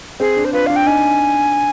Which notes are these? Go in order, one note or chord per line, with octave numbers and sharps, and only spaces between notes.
C4 G#4
D4
C5
F4 B4
D4 F5
G5
D#4 G#5